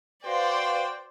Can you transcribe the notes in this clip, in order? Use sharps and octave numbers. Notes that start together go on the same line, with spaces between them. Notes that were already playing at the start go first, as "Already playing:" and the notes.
F#4 B4 C5 D5 F5 G5 C6